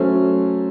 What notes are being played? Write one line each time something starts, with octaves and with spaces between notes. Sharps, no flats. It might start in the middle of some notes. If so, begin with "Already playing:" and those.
Already playing: F#3 A3 C#4 A4 C5